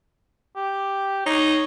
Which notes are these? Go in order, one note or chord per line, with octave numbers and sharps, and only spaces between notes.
G4
D#4 C#5